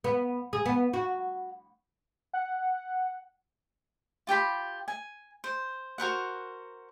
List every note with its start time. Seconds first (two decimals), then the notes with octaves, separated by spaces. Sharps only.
0.04 B3
0.53 G#4
0.66 B3
0.93 F#4
2.33 F#5
4.27 F4 G4 G5 B5
4.88 G#5
5.44 C5
5.98 F#4 A#4 C5 F#5